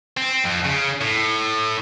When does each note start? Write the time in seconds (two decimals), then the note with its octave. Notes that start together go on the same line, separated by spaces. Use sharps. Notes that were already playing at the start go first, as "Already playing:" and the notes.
0.17 C4
0.45 F2
0.65 C#3
1.01 A2